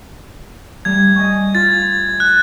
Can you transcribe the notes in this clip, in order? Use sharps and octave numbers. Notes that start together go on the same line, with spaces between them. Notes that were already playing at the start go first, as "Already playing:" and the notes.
G3 A3 G#6
D#5 G#5 C#6
F4 A6
F#6